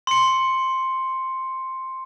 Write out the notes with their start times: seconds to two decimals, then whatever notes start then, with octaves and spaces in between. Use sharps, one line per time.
0.07 C6 C#7